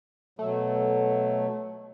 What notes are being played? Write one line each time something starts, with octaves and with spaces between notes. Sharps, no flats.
B2 F#3 A3